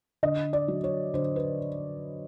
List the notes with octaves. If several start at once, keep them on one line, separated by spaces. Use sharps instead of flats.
D3 D#5
D5
F#3
C#5
D3 C5
B4